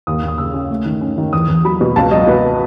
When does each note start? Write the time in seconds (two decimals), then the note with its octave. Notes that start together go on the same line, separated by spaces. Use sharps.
0.07 D#2 D#6
0.23 D#2
0.28 D#6
0.38 C#3 E6
0.54 C#4
0.70 A3
0.86 D#3
1.01 C#4
1.18 D#3
1.33 E2 D#6
1.48 E2
1.64 F#3 B5
1.81 B2
1.96 C#2 A5
2.11 F#3 D#5
2.27 B2 B4